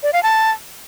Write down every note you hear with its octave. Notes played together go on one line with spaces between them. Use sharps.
D5
F5
A5